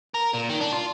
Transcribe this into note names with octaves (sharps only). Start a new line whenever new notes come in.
A#4
A#2
D#3
D4
F4